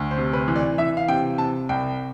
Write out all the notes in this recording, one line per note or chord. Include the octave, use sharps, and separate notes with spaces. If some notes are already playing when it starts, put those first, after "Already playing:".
Already playing: D2
C5
C3
B4
E3
D5
E3 E5
F5
C3 G5
C3 A5
C2 G5